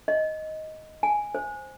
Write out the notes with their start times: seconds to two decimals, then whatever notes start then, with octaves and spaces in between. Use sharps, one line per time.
0.08 D#5
1.03 G#5
1.35 C5